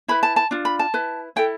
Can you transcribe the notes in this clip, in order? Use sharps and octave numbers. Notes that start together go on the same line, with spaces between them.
E4 B4 B5
A5
A5
D4 F4
B5
A5
E4 B4
E4 A4 G5